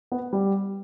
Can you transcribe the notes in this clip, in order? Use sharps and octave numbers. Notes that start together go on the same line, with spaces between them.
B3
G3